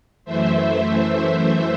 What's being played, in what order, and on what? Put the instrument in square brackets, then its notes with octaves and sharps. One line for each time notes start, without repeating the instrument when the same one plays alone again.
[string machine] F#2 E3 A3 C5 E5